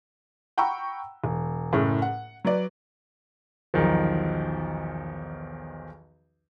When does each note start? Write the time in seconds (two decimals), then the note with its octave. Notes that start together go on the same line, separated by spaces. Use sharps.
0.57 F#5 G5 A#5 B5 C#6 E6
1.24 E1
1.72 F#1 A2 C#4 G#4
2.02 F#5
2.45 F#3 B4 D5
3.74 B1 E2 D#3 F3